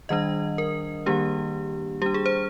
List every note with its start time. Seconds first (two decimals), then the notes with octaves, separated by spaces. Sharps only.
0.09 D#3 G3 D4 D#5
0.58 A#4
1.06 D#3 G3 A#3 D4 G4
2.02 G3 G4
2.06 D4
2.14 G#4
2.26 C5